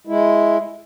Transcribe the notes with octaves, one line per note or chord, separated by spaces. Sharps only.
G#3 E4